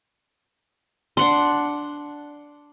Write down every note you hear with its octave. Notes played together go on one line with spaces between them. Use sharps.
D4 F#5 C6